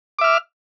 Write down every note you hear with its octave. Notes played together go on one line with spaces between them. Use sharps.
E5 D6 F6